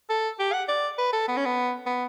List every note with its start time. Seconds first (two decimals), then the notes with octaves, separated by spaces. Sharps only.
0.10 A4
0.39 G4
0.53 F#5
0.68 D5
0.98 B4
1.13 A4
1.28 B3
1.37 C#4
1.45 B3
1.86 B3